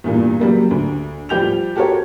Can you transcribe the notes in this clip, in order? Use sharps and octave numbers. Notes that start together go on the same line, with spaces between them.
E2 G2 A#2
C#3 F#3 G3 A#3
D2
F3 G3 G4 G6 F7
F#4 G4 A4 A#4 C#5